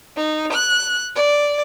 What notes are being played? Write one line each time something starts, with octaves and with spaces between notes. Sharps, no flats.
D#4
F#6
D5